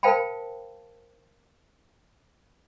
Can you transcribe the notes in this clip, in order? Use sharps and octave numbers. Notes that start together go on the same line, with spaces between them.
A#4 C5 F5 G5 A5 B5